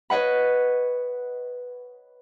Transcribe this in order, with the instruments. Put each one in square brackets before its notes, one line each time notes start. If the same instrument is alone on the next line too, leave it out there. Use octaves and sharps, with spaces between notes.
[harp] B4 C#5 D#5 F#5 B5